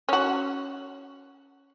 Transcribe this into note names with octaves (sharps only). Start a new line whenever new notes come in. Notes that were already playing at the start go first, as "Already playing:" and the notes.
C#4 F#4